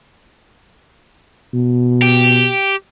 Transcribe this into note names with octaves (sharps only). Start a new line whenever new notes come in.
B2
G4